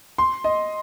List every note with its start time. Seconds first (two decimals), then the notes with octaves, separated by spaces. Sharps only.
0.18 C6
0.44 D#5